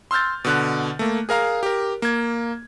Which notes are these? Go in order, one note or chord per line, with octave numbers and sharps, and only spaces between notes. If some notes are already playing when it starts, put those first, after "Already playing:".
C6 E6 F6 G6 A6
B2 D3 F#6
A3 A#3
G#4 A#4 F5 A#5
G4 A#4
A#3 G#6